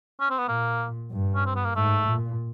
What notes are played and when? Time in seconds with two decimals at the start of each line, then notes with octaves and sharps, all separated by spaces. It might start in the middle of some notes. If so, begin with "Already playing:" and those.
0.20 C#4
0.30 C4
0.39 B3
0.48 A#2 A#3
1.11 G2
1.35 C#4
1.46 C4
1.55 B3
1.65 A#3
1.75 G#2 A3
2.07 A#2